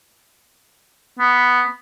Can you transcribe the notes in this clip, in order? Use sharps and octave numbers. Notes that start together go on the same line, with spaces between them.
B3